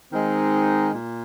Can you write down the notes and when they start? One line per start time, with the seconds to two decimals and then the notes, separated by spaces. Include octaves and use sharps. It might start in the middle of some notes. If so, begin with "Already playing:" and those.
0.13 D#3 G#3 C4 D#4
0.94 A#2